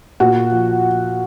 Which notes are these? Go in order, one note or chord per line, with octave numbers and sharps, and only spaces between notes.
A#2 F#4 F#5
F3